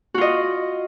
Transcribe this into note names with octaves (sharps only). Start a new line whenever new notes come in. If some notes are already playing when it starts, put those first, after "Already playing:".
F4 F#4 D#5